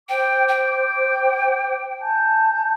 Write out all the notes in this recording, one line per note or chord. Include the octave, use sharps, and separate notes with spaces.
C5 G5 D6 G6
G5
G#5 A5 G6